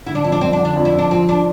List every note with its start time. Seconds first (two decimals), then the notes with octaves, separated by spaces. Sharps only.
0.06 D3 E4
0.15 D4
0.24 F2 E4
0.32 D4
0.41 F2 C4
0.53 D4
0.59 D3
0.65 D4
0.76 F2
0.85 E4
0.94 F2 D4
1.11 F3 C4
1.29 D4